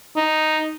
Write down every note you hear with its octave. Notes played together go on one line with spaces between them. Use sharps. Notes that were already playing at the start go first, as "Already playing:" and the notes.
D#4